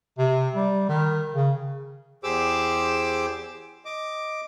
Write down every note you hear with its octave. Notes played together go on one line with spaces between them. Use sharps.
C3
G3
D#3
C#3
E2 G4 G#4 C5 D6 E6
D#5 D6